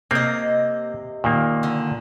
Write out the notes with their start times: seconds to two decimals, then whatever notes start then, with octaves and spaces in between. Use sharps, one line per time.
0.11 C3 A#3 C4 D#5
1.24 A#2 D#3 A#3
1.63 D3